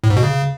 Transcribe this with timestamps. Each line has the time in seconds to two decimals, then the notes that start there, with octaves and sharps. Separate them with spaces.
0.04 A2
0.10 G#2
0.17 B2
0.23 C#3